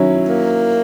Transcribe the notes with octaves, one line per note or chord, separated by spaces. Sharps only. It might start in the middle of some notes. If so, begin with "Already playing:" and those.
Already playing: D#3 F#3 C#4 E4
A#3